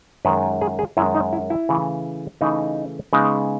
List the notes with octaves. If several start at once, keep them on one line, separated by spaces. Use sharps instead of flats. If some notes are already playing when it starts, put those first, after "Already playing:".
F#2 D#3 G#3 B4
G#4
G#4
F#2 D#3 G#3 E4
D#4
E4
E4
C#3 E3 A3
C#3 E3 A3 D#4
C#3 G#3 B3 D#4